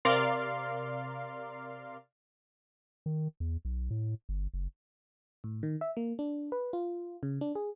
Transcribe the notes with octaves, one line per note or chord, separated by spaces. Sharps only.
C3 A#4 D5 F5 C6
D#3
E2
B1
A2
G1
F#1
A2
D#3
E5
A#3
D4
B4
F4
C#3
D4
G#4